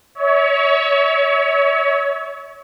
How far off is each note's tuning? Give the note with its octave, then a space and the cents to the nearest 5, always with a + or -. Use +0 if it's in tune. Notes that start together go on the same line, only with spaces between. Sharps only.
C#5 +25 E5 -35